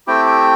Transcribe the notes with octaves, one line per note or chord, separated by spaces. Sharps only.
A3 C4 E4 G4 G5
G5